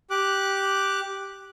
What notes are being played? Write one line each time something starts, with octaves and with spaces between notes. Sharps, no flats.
G4 D6 F#6